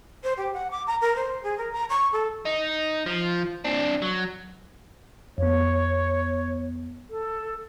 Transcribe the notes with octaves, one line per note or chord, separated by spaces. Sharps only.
C5
G4
F#5
D6
A#5
A#4
C5
G#4
A#4
A#5
C#6
A4
D#4
F3
C4 D4
F#3
F2 B3 C#5
A4